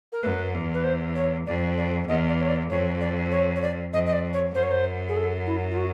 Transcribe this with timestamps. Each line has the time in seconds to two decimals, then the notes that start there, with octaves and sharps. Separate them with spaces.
0.13 A#4
0.23 F#2 B4
0.54 E2
0.74 B4
0.84 C5
1.16 C#5
1.46 F2 D5
1.77 D5
2.07 E2 D#5
2.28 D5
2.40 C#5
2.49 D5
2.70 F2 C#5
3.01 D5
3.32 C#5
3.56 C#5
3.62 D5
3.93 F2 D#5
4.06 D#5
4.13 D5
4.33 C#5
4.54 F#2 C5
4.63 C#5
4.71 C5
5.09 G#4
5.17 A4
5.46 E4
5.71 F4
5.77 F#4